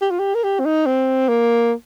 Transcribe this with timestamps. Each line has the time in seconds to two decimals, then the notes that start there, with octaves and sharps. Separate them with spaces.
0.02 G4
0.11 F4
0.19 G4
0.35 A#4
0.44 G4
0.60 C4
0.65 D#4
0.86 C4
1.29 A#3